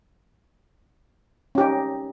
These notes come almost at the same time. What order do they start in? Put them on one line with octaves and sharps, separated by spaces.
C#4 G4 D#4